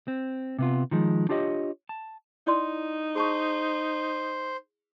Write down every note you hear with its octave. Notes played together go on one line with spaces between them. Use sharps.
C4
C3 B3 F4
D#3 F3 G#3
D4 F4 G4 C#5 D#5
A5
D#4 E4 D5 C6
G#4 C5 A5 C#6